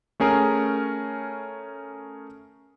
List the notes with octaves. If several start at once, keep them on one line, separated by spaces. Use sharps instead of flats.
A3 C#4 G#4 A#4